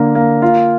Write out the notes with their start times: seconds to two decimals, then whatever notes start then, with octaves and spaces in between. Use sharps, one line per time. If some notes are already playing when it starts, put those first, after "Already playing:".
Already playing: D3 A#3
0.15 A#3
0.42 F4